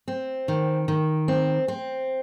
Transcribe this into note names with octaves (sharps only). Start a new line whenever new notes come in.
C4
D#3
D#3
C4
C4